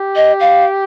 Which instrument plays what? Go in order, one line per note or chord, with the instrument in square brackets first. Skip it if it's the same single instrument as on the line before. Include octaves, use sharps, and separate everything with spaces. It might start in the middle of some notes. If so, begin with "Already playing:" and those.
Already playing: [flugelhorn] G4
[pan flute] D#5
F5